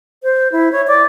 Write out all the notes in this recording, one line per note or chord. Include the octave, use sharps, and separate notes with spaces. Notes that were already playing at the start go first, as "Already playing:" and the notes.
C5
E4
C#5
D5